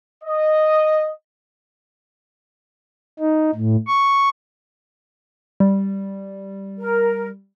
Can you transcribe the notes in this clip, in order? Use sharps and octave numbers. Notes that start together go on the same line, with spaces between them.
D#5
D#4
A2
C#6
G3
A#4